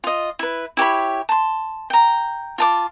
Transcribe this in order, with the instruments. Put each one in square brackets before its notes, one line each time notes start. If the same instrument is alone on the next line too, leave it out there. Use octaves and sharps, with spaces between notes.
[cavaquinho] F4 D#5
E4 B4
E4 G4 C#5 B5
A5 C6
G5 A#5
F4 A5 D6